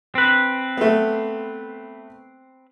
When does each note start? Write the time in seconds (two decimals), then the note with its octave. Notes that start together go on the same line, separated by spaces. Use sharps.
0.15 C4 B4
0.77 A3 B3